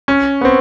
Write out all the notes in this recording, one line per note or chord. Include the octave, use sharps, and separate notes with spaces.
C#4
B3
C4